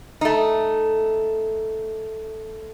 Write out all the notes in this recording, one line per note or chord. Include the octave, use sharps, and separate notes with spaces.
A3 D#4